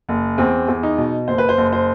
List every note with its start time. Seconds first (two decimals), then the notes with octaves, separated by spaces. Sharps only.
0.09 F#1
0.38 E2 C4
0.68 E2
0.83 D#4
0.98 B2
1.28 F#1 C5
1.38 B4
1.49 C5
1.58 F#1
1.73 C5